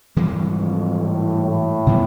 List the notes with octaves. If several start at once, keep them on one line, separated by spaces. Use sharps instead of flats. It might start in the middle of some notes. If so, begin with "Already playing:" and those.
G#2 E3 G3 A#3
F2
A2
A2
C3 E3 G3 B3